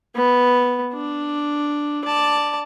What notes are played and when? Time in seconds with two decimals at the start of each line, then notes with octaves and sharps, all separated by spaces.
0.16 B3
0.93 D4
2.04 D5 A5